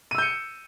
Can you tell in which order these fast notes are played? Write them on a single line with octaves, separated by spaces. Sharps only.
D#7 E6 G6 C#7